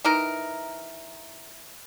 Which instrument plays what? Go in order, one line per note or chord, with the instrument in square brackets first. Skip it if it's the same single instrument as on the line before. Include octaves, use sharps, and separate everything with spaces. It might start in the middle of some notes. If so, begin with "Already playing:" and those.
[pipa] E3 D#4 A#4